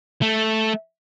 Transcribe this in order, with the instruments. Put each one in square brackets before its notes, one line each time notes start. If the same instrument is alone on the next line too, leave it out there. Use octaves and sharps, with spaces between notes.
[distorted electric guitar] A3